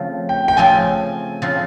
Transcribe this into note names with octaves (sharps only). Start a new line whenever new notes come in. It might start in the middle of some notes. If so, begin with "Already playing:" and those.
Already playing: C#3 F3 A3 C4 F4
G5
G5
C#3 F3 A3 C4 F4 G#5
C#3 F3 A3 C4 F4